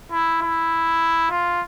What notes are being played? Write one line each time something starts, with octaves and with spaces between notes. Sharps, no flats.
E4
E4
F4